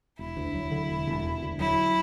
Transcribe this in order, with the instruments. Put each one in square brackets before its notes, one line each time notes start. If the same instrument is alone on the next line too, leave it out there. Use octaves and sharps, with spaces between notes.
[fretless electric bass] E1 [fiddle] E4
[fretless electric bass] D2
F#3
D3
E1
E1
E1
D2
[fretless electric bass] F#3 [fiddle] E4